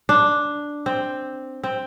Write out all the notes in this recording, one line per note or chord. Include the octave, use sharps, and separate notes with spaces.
D4
C4
C4